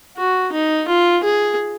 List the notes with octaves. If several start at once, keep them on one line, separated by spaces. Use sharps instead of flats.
F#4
D#4
F4
G#4